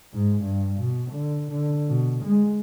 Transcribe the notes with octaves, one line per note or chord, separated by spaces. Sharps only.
G#2
G2
B2
D3
D3
B2
G#3